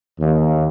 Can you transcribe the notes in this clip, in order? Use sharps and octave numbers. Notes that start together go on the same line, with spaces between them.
D#2